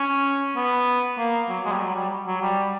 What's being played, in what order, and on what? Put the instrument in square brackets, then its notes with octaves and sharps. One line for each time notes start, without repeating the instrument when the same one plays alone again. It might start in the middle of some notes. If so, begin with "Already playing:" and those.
Already playing: [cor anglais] C#4
B3
A#3
F#3
G#3
G3
F#3
G3
F#3
G3